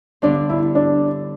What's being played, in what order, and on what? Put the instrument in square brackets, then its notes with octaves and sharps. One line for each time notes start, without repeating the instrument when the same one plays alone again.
[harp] G2 D3 G3 B3 [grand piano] D4
[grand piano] E4
D4